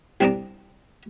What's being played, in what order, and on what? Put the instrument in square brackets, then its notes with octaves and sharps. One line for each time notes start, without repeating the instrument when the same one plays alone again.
[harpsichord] C2 C4 D4 A5 A#5 D6